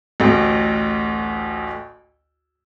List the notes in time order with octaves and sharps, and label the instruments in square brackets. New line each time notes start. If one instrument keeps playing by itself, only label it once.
[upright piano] A1 D2